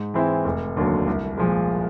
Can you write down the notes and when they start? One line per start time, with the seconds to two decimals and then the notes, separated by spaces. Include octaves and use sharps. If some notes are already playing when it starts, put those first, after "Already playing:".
Already playing: G#2
0.14 E3 G#3 C4 E4
0.45 F1
0.77 D#2 D3 F#3
1.07 C2
1.38 A#2 F3 G#3